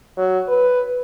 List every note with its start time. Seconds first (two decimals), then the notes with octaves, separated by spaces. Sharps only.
0.17 F#3
0.48 B4